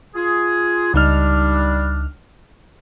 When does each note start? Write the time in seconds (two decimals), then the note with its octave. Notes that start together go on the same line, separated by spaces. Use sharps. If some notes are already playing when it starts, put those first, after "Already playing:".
0.16 F4 G#4
0.94 C#2 G3 D4 D#4 F6